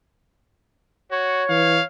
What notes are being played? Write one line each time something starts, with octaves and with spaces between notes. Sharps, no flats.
F#4 C#5
E3 F5